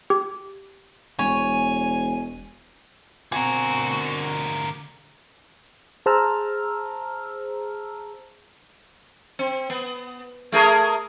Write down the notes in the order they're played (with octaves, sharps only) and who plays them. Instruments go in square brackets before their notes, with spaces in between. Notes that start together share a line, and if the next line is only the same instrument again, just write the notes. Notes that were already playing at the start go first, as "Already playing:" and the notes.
[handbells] G4
[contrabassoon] E1 [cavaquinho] C#5 [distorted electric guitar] G#5
[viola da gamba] B2 C4 F#4 [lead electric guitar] D3 A#4 [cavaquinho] G#5
[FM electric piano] G#4 C5 A5 A#5 E6 F6
[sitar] C4
B3
A3 G#4 A#4